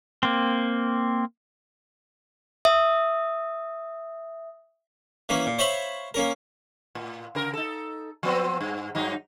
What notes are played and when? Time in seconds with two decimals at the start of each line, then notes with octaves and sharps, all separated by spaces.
0.23 A#3 C4
2.65 E5 D#6
5.29 E3 A#3 C#4
5.46 A#2
5.59 C5 C#5 E5 F5 B5 C6
6.14 A#3 C#4 A#4
6.95 A2
7.35 C#3 A#4
7.53 D#4 A4
8.23 F3 B3 C4
8.61 G2
8.95 G2 F#3 D#4